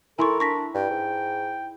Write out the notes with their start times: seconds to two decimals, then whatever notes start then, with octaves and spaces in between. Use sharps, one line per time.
0.19 E4 A4 A#4 G#5 C6 C#6
0.40 D4 C#6 A#6 B6
0.75 G2 G5
0.90 G#2